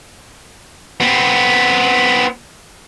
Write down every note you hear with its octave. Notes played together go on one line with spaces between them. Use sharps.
B3 C4